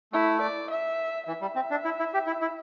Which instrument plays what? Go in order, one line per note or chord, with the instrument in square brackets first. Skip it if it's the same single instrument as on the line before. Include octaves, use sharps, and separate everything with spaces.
[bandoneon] A3 [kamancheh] E4
[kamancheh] D5
E5
[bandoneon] E3 [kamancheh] E5
[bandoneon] G3
C4
D4
E4
E4
G4
E4
E4